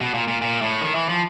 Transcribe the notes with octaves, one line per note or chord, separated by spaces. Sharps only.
B2
A#2
A#2
A#2
A2
D#3
E3
F3